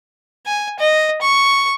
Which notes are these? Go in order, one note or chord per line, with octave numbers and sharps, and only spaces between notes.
G#5
D#5
C#6